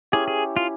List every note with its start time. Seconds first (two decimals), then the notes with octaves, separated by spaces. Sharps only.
0.12 C#4 E4 G4 G#4
0.28 G#4
0.57 F4